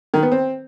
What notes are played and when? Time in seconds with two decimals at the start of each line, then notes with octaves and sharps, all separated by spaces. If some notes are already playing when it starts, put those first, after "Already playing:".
0.14 D#3
0.23 B3
0.32 C4